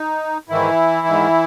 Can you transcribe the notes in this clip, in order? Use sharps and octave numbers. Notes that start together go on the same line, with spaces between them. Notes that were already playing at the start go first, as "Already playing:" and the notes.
Already playing: D#4
G#2 D#3 E3 E4
G#2 D#3